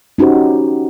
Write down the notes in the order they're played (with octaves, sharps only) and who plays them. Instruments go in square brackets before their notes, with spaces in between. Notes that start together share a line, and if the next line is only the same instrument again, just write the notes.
[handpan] C#4 D#4 F#4 G4 C5